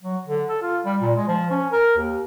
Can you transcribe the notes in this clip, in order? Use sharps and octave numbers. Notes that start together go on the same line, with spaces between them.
F#3
D3
A4
F4
G3
A#2
G#3
F3
C#4
A#4
D#2